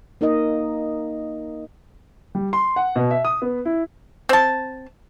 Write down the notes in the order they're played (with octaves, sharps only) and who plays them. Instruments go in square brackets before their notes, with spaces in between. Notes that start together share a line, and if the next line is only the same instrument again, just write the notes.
[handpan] A#3 D#4 A#4 D#5
[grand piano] G3
C6
F#5
B2
E5
D#6
B3
E4
[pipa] C4 A5